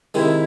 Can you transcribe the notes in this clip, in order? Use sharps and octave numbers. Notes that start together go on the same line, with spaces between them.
C3 D#3 G#3 E4